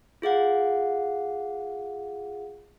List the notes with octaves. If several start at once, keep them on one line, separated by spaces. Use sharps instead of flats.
F4 G#4 F5 F#5